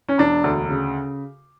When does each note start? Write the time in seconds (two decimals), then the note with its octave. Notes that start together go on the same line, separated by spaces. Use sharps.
0.09 C#4
0.18 E1 D4
0.44 D2
0.70 C#3